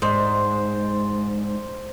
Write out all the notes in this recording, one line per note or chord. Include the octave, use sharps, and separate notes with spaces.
G#2 C5 D5